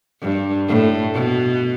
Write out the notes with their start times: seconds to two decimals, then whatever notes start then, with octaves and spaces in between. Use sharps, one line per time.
0.22 G2
0.68 A2
1.14 B2